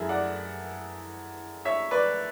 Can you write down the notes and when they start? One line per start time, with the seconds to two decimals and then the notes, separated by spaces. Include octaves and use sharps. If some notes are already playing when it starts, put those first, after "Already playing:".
Already playing: F#2 E3 E4 G#4 A4
0.09 D5 F#5
1.65 C#5 E5
1.91 B4 D5